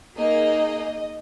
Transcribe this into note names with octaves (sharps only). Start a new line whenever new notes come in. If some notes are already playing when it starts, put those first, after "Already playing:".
A#3 D#4 G#4 D#5